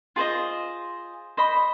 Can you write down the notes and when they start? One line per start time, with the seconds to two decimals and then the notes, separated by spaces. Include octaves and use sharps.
0.16 F4 G#4 C5 D#5
1.37 C5 D#5 B5